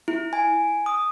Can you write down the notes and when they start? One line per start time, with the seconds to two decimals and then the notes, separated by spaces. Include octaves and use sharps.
0.08 E4
0.33 G#5
0.86 D#6